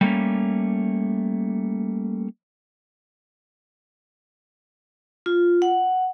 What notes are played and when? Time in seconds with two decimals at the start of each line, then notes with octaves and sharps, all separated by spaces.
0.01 G3 A3 A#3 C#4
5.26 F4
5.62 F#5